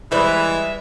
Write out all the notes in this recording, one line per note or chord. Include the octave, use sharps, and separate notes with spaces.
E3 G3 G#3 B4 E5